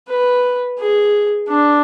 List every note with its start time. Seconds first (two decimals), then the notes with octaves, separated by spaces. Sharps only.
0.09 B4
0.79 G#4
1.49 D4